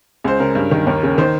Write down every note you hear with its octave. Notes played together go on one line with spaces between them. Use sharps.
C#2 C5
C#3 A#4
G2
D#3
D#2 A#4
C#3
D#3 C5